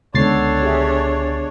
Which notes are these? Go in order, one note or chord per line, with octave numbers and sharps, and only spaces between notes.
C#2 D3 B3 D4 A4 C#5 A6 C7
G4 G#4 E5